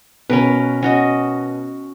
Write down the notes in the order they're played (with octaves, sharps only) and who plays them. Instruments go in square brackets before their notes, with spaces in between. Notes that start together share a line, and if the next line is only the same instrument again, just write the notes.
[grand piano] B2 B3 [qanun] C#4 A#4 B4
[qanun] C#4 F#4 D#5